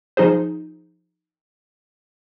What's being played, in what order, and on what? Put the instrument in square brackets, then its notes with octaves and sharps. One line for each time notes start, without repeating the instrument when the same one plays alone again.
[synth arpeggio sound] F3 D#4 G#4 C5